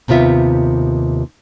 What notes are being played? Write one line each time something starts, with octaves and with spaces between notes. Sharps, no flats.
D#2 C3 B3 F4 E5